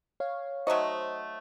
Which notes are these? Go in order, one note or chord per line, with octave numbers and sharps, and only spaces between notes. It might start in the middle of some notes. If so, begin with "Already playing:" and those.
C#5 F5
F#3 A3 D#4 F#4 C5 D#5